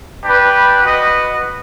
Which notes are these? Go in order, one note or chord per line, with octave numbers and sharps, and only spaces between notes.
D4 G4 B4
F#4 B4 D#5